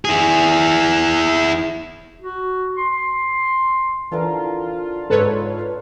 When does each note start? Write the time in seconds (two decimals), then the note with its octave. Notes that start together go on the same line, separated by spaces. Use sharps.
0.05 E4 G#4
2.22 F#4
2.77 C6
4.11 D3 E3 F3 F4 A#4
5.10 G#2 A4 B4 C#5 F#6